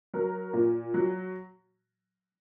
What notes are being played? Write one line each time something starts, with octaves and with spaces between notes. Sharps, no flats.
F#3 A#4
A#2
F#3